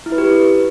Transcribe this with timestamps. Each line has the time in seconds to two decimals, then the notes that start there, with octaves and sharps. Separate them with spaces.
0.06 E4
0.12 B4
0.18 G4